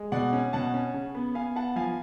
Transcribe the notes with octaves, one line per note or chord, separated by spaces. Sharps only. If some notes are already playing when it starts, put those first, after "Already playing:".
Already playing: G#3
B2 D5 F#5
C#4
B2 F#5 A5
C#4
C#3
B3
B3 F5 G#5
B3 F#5 A5
F3 F5 G#5